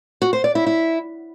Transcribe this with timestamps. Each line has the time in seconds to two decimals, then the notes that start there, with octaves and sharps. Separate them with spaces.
0.22 F#4
0.33 C5
0.44 D5
0.55 E4
0.66 E4